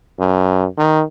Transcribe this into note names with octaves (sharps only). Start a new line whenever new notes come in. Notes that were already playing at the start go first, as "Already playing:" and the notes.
F#2
D#3